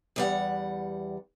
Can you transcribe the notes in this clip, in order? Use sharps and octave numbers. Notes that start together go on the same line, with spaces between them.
E2 G3 F#5